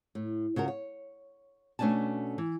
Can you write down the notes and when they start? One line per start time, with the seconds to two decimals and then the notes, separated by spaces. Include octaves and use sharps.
0.15 A2
0.56 C#3 F4 F#4 A#4
0.68 C#5
1.79 B2 A3 C#4 D4 G#5 A5
2.38 E3